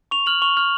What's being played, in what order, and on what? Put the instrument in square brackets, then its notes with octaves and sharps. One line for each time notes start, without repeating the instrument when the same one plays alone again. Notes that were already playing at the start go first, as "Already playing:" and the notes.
[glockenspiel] C#6 F7
F6 F#7
C#6 F7
F6